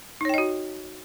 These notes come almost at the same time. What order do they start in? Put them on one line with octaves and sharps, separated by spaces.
D#4 C#5 G5 D#5 F#4